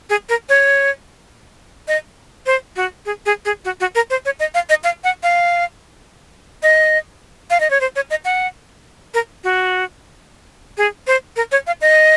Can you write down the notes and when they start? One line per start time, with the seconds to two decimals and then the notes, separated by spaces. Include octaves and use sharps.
0.10 G#4
0.29 A#4
0.49 C#5
1.88 D#5
2.46 C5
2.76 F#4
3.06 G#4
3.26 G#4
3.45 G#4
3.65 F#4
3.80 F#4
3.95 A#4
4.10 C5
4.25 C#5
4.40 D#5
4.54 F5
4.69 D#5
4.84 F5
5.04 F#5
5.23 F5
6.63 D#5
7.50 F5
7.60 D#5
7.70 C#5
7.81 C5
7.96 C#5
8.10 D#5
8.25 F#5
9.14 A#4
9.44 F#4
10.78 G#4
11.07 C5
11.36 A#4
11.52 C#5
11.67 F5
11.81 D#5